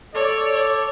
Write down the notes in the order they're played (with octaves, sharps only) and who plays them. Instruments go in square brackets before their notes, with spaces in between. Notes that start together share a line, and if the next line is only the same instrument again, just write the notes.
[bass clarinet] A4 [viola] C#5 [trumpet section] D5